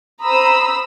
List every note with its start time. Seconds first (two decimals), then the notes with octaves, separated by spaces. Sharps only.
0.24 C5 A#5 B5 D#6 E6